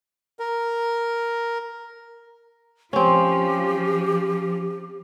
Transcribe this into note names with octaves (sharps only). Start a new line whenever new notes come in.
A#4
F3 C4 C#4 G4